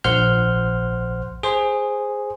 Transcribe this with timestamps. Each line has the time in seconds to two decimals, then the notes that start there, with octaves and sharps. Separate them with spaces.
0.04 A#1 C5 F#5 C6 F6 G6
1.43 G#4 C5